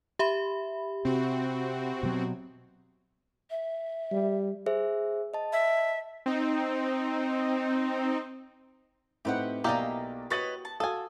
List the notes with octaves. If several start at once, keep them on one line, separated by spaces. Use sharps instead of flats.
G4 E5 B5
C3 C4 F#4
B2 F#3
E5
G3
G#4 C5 E5
D#5 A5
E5
C4 D#4
A2 C4 D#4 G4 B4 F#5
B1 A#3 E4 G4 D5 D#5 F5 A#5
F#4 B4 C#5 D#5 A6 F#7
A5
F#4 A4 F5 G#5 D#6